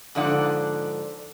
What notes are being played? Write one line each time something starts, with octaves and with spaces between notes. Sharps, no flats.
G#2 D3 F3 D5 F#5